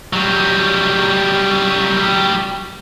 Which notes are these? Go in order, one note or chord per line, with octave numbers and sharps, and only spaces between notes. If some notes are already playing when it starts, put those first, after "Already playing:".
F#3 G3